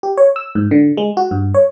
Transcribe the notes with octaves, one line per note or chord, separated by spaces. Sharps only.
G4
C#5
E6
G#2
D3
G#3
F#4
G2
C#5